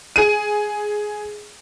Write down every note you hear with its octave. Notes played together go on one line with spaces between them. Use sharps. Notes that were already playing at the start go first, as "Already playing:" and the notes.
G#4 D#7